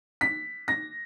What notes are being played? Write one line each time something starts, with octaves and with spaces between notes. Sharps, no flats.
B6
A#6